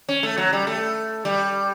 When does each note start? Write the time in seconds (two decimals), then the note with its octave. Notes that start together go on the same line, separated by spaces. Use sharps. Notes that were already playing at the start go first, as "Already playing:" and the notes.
0.09 C#4
0.23 A3
0.38 F#3
0.53 G3
0.67 A3
1.25 G3